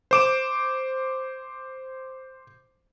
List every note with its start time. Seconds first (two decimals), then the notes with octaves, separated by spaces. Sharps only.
0.11 C5 D6 E7